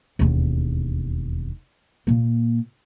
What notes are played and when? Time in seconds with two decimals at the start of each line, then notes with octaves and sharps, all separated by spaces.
0.19 E1 D#2
2.07 A#2 A#3